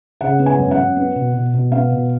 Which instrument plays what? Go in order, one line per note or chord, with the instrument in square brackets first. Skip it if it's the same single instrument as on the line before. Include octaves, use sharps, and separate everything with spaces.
[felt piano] C#3 F#5
B3
G#5
F#2
F#5
F#2
B3
B2
B2
B2
B3 F5
B2